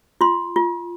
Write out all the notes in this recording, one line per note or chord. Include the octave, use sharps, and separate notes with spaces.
F4 C6
F4